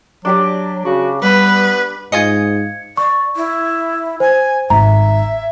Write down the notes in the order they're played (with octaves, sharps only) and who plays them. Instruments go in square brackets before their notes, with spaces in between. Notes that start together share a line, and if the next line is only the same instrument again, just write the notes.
[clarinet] F#3 [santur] D4 G4 D5
[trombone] C#3 [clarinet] F#4
[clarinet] G3 [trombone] B3 [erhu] B4
[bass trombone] G#2 [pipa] F4 G#4 D#5 [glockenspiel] G#6 C#7
[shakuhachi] D5 [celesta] C#6
[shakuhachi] E4
[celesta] C5 [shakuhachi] G#5
[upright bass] G#1 [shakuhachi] E5 [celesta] A#5